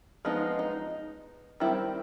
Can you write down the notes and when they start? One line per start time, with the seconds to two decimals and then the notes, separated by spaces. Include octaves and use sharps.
0.25 F3 G#3 B3 D#4
0.59 D#4
1.60 D#3 G3 C4 E4